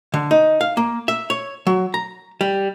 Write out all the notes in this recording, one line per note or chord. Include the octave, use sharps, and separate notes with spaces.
D3
D#4
F5
A#3
E5
C#5
F#3
A#5
G3